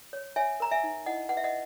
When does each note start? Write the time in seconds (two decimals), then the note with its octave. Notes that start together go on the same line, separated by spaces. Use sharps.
0.13 C#5
0.36 C#5 E5 G#5
0.60 A#4 A#5
0.71 E5 G#5
0.83 D#4
1.06 E4 D#5 F#5
1.29 B4 F#5
1.37 E5
1.44 D#5 F#5